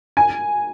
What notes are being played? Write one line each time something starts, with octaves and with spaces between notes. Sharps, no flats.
G#5